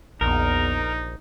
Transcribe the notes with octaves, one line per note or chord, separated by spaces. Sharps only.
A#1 E2 D#4 A#4